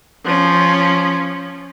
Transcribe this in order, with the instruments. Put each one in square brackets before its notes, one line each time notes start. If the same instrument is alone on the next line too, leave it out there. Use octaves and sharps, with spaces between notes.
[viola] F3 C#4